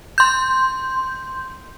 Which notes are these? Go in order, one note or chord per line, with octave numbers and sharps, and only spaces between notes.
C6 G6